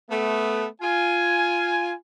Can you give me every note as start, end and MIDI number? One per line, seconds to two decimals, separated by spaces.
0.10 0.66 57
0.10 0.66 59
0.82 1.93 65
0.82 1.93 80